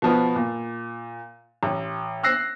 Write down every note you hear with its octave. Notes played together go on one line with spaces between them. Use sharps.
B2 F3 B3
A#2
A1
E6 F#6 A#6 C7